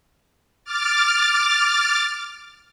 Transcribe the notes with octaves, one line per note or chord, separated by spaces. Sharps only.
D6 F6 A6